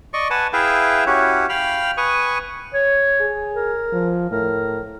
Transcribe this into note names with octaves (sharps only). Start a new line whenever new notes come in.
D5 D#5 C#6
B4 F#5 G#5 A5
E4 G#4 B4 E5 F5 G5
C#4 E4 F#4 G4 C#5
F5 G5 B5 F6
B4 G#5 C#6 D#6
C#5
G#4
A#4
F3
A2 A#4